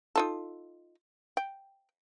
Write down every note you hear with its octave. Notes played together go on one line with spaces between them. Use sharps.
D#4 F4 A4
G5